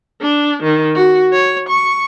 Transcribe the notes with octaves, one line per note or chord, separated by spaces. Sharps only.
D4
D#3
F#4
C#5
C#6